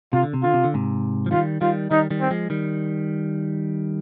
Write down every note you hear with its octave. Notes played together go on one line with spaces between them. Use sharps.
C3 F4
D3
C3
D3 F4
C3
D3
G#2 C3
F3
D#3 G3 F4
D#3 G3 F4
D#3 G3 D#4
D#3 G3
C4
F3 G#3
D#3 G3